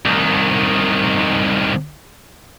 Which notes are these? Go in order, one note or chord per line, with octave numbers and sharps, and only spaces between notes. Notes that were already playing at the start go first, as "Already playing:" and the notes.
C2 D#3